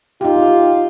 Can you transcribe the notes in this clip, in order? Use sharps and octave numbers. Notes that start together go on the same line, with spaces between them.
D#4 F4 G4